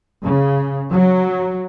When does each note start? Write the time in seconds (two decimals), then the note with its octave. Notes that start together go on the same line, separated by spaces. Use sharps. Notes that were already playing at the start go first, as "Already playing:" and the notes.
0.23 C#3
0.91 F#3